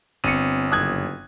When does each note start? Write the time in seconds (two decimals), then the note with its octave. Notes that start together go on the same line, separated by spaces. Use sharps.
0.24 G1 C4 C#7 D#7
0.71 F#1 D#6 F#6 G#6